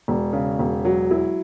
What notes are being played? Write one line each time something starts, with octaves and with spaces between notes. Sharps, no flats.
E1
C#3
E1
F#3
E4